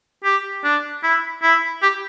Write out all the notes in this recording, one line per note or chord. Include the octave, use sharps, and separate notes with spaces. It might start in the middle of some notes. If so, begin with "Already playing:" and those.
G4
D4
E4
E4
G4